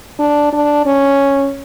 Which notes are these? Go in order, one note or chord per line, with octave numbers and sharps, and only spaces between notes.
D4
D4
C#4